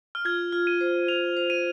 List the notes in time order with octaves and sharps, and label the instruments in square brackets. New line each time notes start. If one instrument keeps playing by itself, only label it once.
[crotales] F6
[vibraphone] F4 [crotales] G#6
[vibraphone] F4
[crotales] D#7
[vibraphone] C5
[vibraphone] F4 [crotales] F7
[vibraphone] C5
[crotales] D#7